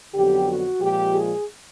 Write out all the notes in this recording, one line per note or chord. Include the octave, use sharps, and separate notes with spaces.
F2 D3 F#3 B3 G4
F#4
A#2 F3 G#3 G4
G#4